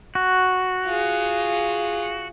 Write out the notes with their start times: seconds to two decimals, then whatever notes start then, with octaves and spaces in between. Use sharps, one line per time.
0.15 F#4
0.85 F4 G#4